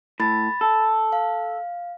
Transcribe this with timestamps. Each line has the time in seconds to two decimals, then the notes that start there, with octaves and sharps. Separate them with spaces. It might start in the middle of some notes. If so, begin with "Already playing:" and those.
0.20 A2 B5 A6
0.61 A4
1.12 F5